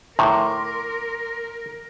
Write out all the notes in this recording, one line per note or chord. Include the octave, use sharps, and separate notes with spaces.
A2 A#4 A#5 C6 D6